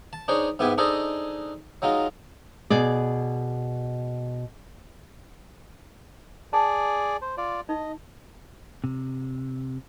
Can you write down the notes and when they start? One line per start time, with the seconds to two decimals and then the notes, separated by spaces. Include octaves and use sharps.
0.13 A5
0.28 D4 D#4 G#4 C5 C#5
0.59 G#2 B3 E4 G4 B4 G#5
0.78 D4 D#4 G#4 A4 C5 D#5
1.82 F#3 G#3 D#4 F4
2.70 B2 G#4 D5
6.53 G#4 D5 A5
7.22 C5
7.38 F4 D5
7.69 D#4 D#5
8.84 C3